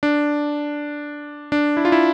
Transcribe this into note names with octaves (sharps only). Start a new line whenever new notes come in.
D4
D4
E4
F4
E4